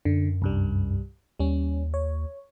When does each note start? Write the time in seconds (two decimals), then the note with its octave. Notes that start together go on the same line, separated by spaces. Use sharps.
0.05 F#2 D3
0.42 C2 G2 G3
1.40 D#2 G3 C#4
1.94 C#5